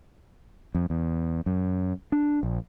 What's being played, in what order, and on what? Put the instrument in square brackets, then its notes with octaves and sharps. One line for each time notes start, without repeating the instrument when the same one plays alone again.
[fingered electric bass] F2
E2
F#2
D4
A#1